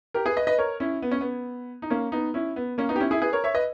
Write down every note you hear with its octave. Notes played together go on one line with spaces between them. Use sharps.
G4 A#4
G#4 B4
B4 D#5
B4 D#5
A#4 C#5
C#4 E4
B3
C#4
B3
D#4
A#3 C#4
B3 D#4
C#4 E4
B3
A#3 C#4
B3 D#4
G4
C#4 E4
E4 G#4
G#4 B4
A#4 C#5
C#5 E5
B4 D#5